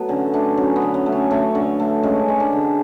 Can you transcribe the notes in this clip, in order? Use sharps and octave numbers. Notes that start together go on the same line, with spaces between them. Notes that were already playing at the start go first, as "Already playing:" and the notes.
Already playing: F#3 A3 B3
D3 C#4
A3 D4
F#3 C#4
B3
D3
C#4
A3
C#4
A3 C#4
D3
A3
G#3 C#4
G#3
D4
D3